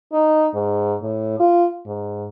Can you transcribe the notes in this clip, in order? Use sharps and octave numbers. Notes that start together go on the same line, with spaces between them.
D#4
G#2
A2
F4
G#2